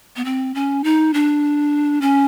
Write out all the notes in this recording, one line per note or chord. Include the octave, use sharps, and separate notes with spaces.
B3
C4
C#4
D#4
D4
C#4